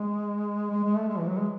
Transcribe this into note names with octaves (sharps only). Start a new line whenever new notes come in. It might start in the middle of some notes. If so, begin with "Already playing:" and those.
Already playing: G#3
G#3
G#3
A3
G#3
E3
F#3
G#3